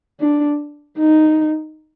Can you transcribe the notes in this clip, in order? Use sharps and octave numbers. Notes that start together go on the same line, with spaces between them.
D4
D#4